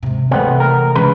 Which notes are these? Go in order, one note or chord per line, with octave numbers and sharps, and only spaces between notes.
G#2 C3
C3 E3 A3 B3 C4
A#4
C#3 E3 G#3 D4 B4